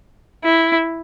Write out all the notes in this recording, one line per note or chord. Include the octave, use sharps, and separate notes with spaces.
E4